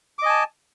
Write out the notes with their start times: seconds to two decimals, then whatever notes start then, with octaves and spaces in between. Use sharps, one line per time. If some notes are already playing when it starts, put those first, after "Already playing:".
0.19 D6
0.22 D#5
0.26 G#5
0.29 A5